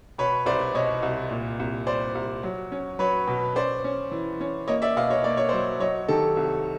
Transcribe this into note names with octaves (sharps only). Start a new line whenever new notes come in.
B2 B4 C#5
C2 C5 D5
B2 C#5 D#5
C2
A#2
C2
G3 C5 D5
C2
F#3
C#4
F#3 B4 C#5
B2
C#4 C5 D5
C#4
E3
C#4
A#3 C#5 D#5
D5 E5
B2 D#5 F5
C#5 D#5
A#3 D5
C#5
F#3 C5 D5
F#3 C#5 D#5
D#3 G4 A4
C2